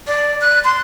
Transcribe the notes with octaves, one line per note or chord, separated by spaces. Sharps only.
D5
F#6
C6